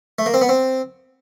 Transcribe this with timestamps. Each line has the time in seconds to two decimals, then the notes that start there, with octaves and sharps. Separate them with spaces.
0.19 A3
0.26 A#3
0.34 C4
0.41 B3
0.49 C4